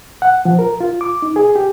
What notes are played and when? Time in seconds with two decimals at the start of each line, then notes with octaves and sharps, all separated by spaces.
0.22 F#5
0.45 F3
0.59 A#4
0.80 F4
1.01 D6
1.22 D#4
1.36 G#4
1.56 G4